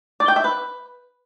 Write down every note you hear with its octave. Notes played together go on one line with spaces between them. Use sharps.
D5
G5
E5
B4